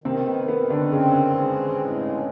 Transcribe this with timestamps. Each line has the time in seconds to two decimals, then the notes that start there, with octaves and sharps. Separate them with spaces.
0.04 C3 D#3 C4
0.26 B3
0.48 D#3 B3
0.70 D3 D4
0.92 C#3 C4 C#4
1.36 G#3
1.80 A2